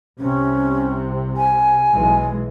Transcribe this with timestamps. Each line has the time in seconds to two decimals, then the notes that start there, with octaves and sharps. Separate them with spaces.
0.19 C2 C3 C#4
1.37 G#5
1.92 B1 E3 G#3